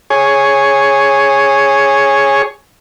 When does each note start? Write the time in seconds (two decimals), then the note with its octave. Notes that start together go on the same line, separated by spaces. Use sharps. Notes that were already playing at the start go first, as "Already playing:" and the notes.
0.10 G#4 C#5